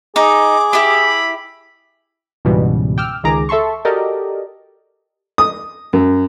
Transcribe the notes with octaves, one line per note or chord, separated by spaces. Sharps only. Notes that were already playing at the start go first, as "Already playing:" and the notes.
D#4 G#4 D6
E4 G4 B5
C#2 G#2 B2 E3 G3
G5 D6 E6 F6
C#2 D#3 G#4 A#5 D6
A4 E5 A5 C6 C#6
F#4 G4 A4 A#4 D5 D#5
D#6
F#2